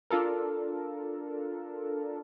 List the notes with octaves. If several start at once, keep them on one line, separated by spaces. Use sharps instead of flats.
D4 F4 A4 A#4